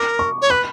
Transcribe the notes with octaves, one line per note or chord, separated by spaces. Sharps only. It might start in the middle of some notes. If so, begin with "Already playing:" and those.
Already playing: A#4 D6
C#6
C#5
B4 B5